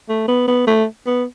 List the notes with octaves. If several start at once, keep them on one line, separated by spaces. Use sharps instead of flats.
A3
B3
B3
A3
B3